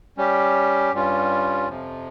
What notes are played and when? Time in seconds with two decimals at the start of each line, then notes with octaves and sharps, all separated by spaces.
0.18 G3 C#4 G4
0.93 G2 G3 C#4 F4
1.68 F2 C3 F3